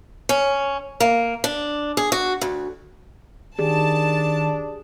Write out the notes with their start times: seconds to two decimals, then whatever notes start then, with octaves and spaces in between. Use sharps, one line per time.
0.29 C#4
1.00 A#3
1.44 D4
1.97 G#4
2.12 F#4
2.41 D2
3.59 D#3 D4 G4 G#4 A5